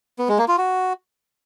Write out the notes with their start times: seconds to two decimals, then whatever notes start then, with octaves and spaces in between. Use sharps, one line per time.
0.19 B3
0.29 G#3
0.38 A#3
0.48 F4
0.58 F#4